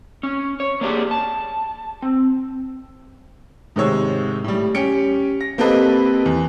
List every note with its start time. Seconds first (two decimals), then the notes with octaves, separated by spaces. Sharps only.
0.23 C#4
0.60 C#5
0.81 A#3 C#4 D4 E4 G4 G#4
1.11 A5
2.02 C4
3.76 G#2 C3 D#3 G#3 C#5 E6
4.44 A2 G3
4.75 C#4 G4 C#7 D7
5.41 A#6
5.58 A#3 C4 G4 A4 B4 D#5
6.26 E2